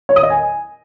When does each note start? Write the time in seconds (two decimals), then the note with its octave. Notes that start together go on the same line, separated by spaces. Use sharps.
0.09 C#5
0.16 D#6
0.23 D#5
0.30 G#5